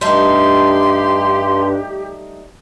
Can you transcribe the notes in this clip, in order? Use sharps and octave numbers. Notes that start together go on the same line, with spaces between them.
G2 G3 A3 D4 D#4 G4 C6